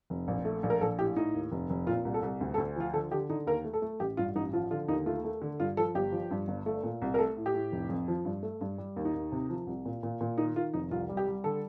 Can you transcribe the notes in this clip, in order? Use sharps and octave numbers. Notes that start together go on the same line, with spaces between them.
F1
A#1
A3
A#1
A#4
A#1 A4
A2 G4
A2 D#4
D#2
F1
F1
A#2 F4
C2
A4
C2
D2
A4
D2
F3 F4
D3 A4
D3 G4
D3 D#4
D#2 A#4
A3
A4
A3
A1 G4
G2 F4
A1 D#4
F3 F4
D3 F4
D#2 D#4
A3 F4
A3
D3
G2 F4
F3 A4
G1 G4
F3
G2
G1
A3
A#2
C2
A#4
A3 A4
A2
G4
A2
F1
F2
F3
G2
A3
G2
G3
D#2
D#4
D#2
C3
F3
C2
A#2
A#2
A#2
D#3 D#4
D#3 F4
F1 D#4
C2 F4
G3
G4
G3
D3 A4